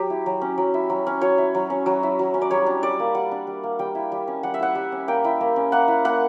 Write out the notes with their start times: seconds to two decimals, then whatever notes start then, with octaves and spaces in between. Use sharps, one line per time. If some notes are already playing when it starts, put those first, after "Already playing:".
Already playing: F#3 G4
0.10 E4
0.26 F#3
0.41 C#4
0.58 F#3
0.74 E4
0.90 F#3
1.07 C#4
1.21 F#3 C#5
1.38 E4
1.55 F#3
1.70 C#4
1.86 F#3
2.03 E4
2.19 F#3
2.34 C#4
2.42 D5
2.51 G3 C#5
2.66 D4
2.83 G3 D5
3.00 A#3
3.14 G3 F#5
3.31 D4
3.47 G3
3.63 A#3
3.79 G3 G5
3.95 E4
4.12 G3
4.28 C#4
4.43 G3 F#5
4.54 E5
4.60 E4 F#5
4.75 G3
4.92 C#4
5.08 A#3 G5
5.24 E4
5.41 A#3
5.56 C#4
5.72 A#3 F#5
5.88 E4
6.05 A#3 F#5